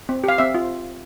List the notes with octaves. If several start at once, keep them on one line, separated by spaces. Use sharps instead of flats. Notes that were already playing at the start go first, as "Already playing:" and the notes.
C4
G4 F5
C4 E5
F4